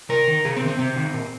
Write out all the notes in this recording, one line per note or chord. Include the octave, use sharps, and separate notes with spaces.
C3 A#4
D#3
C3 G#4
C4
D#3
C4
C3 C4
D#3
A#2